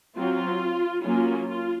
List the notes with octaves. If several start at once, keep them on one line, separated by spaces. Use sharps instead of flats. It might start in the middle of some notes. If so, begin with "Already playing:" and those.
F#3 C4 F4
F#3 A#3 C#4 F4
F4